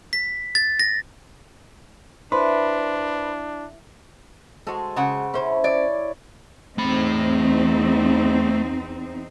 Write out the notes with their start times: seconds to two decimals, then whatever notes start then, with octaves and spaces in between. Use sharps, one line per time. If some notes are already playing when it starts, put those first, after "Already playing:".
0.13 B6
0.55 A6
0.80 A#6
2.32 D4 E4 B4 C5 B5 C6
4.67 G#3 F#4 A4 C5
4.96 C#3 F#5
5.34 C#4 E4 C5
5.64 C#5 D5
6.78 E2 A3 C4 D#4 B5